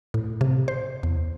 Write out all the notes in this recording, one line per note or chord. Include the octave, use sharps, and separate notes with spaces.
A2
C3
C5
E2